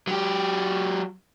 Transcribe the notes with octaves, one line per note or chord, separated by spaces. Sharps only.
F#3 G4